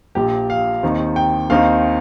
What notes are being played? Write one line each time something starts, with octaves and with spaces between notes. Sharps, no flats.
A#1 A#2 F3 G4
F5
D#2 D#3 C4 D#4
G5
D#2 D#3 C4 D#4 F5